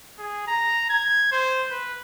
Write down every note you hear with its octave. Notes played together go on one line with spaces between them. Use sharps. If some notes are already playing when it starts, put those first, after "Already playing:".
G#4
A#5
G#6
C5
B4